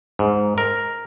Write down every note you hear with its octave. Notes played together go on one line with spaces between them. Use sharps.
G#2
A#4